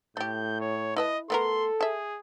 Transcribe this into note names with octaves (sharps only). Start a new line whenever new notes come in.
A2 A3 G4 G6
C#5
E4 B4 D#5 A5
A3 B3 A4 A#4 C6
G#4 E5 A5